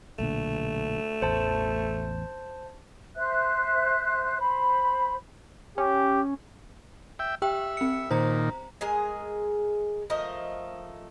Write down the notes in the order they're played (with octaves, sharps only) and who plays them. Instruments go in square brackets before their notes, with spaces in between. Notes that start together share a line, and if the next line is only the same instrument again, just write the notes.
[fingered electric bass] B1 A#2 D3 [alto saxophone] A3
[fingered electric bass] A1 E2 [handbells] C5 A5
[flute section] C5 E5 F#6
C5 B5
[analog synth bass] C#4 [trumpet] G4
[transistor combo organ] E5 G5
[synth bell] G4 G5 [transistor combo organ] E5
[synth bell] C4 C#7
[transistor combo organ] A#2 D#3 [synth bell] C5 A#5
[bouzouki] G#3 G#4 A#4
F3 A3 A#4 D#5